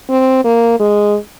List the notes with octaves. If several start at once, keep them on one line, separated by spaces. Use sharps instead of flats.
C4
A#3
G#3